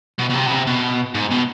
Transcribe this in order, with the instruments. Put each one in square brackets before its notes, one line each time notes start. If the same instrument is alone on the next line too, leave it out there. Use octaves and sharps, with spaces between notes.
[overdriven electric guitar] B2
B2
C3
B2
C3
B2
G#2
B2